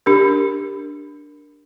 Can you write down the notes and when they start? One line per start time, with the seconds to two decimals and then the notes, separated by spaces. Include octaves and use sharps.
0.06 D4 G4 A#4